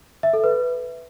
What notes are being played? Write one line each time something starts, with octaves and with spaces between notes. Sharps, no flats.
E5
A4
B4